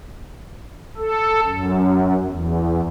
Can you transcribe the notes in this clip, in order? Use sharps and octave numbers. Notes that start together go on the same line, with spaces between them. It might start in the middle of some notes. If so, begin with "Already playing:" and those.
A4
F#2
E2